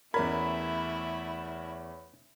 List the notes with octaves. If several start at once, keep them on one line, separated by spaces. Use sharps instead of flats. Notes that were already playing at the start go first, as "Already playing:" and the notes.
E2 A3 C#4 E4 A#4 B5 G#6